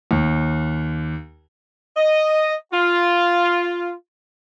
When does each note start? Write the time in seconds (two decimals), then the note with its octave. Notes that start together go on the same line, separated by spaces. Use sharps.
0.11 D#2
1.96 D#5
2.72 F4